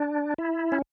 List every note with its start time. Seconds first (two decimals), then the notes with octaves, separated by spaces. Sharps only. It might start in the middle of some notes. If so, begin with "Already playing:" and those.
Already playing: D4
0.38 E4
0.72 C#4